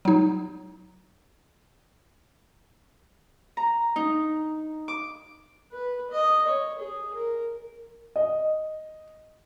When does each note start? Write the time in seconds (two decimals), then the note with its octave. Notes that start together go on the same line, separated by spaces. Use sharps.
0.05 F#3 D#4
3.57 A#5
3.96 D#4
4.88 D6
5.72 B4
6.10 D#5
6.47 C#5
6.79 G#4
7.14 A#4
8.16 D#5